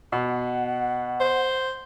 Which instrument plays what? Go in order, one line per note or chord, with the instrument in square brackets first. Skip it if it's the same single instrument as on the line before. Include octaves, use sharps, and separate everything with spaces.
[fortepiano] B2 [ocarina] F#5
[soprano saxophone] C5